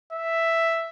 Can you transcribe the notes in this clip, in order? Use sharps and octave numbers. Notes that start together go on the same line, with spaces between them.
E5